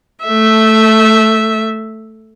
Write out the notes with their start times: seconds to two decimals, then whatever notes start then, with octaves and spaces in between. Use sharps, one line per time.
0.24 A3 E5